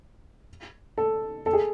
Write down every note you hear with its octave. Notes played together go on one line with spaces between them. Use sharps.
A4
A4
G#4